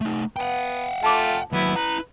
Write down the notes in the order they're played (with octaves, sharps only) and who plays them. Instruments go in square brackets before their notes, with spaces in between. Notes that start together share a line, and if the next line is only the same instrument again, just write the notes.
[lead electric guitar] A3 D#4
[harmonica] B3 [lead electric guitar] F#5 G5
[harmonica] A3 F4 [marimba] A5 D6
[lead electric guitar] D#2 F#3 [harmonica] B3 E4
[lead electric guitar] E4 A#5 [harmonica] B4